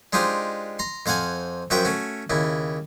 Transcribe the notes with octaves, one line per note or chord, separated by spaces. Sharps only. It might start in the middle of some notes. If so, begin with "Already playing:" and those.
G#3 D4 D#4 F4 G4 C5
A#5 C6
F2 C5 F5 F#5 G#5
F#2 F3 F#4 E5 G5
A3 C#4 F#4
D#2 C#3 E4